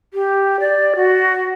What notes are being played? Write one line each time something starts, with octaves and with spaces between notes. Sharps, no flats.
G4
D5
F#4